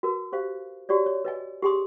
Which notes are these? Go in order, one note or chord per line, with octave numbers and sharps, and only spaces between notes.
F#4 A#4 B4
G4 C5 F5
F#4 G4 C#5 D5
C#5
B4 D#5 G#5
G4 G#4 G#5 C6 D#6